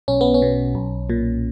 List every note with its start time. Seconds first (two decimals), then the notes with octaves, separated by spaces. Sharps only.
0.08 B1 C#4
0.21 B3
0.34 C#4
0.42 B2
0.75 B1
1.10 A#2